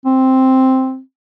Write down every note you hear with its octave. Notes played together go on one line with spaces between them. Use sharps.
C4